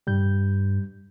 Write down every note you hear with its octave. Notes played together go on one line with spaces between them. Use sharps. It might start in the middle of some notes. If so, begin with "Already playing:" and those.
G2 G3 G6